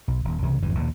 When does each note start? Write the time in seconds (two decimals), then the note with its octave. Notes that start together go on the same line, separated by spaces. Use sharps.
0.08 B1
0.24 D#1
0.43 C2 C#3 E3
0.62 G1 F2 E3
0.75 A#1 D#2 B2